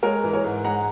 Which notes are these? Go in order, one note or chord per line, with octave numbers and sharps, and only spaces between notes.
G#3 A#4 C#5
E3
A#4 C#5
G#2
G#3 F#5 A#5